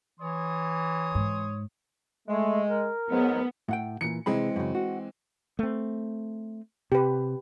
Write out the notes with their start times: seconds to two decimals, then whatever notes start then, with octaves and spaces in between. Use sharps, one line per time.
0.20 E3 C#5 C6 D#6
1.15 G#2
2.28 G#3 A3
2.68 A#4
3.11 G#2 F#3 B3
3.69 A2 F#5 G5
4.01 A#2 E3 C#7
4.26 C3 E3 G#3 C4 G#4 B5
4.56 F#2 C#3
4.75 F#4
5.59 A3 C4
6.92 C3 G4 B4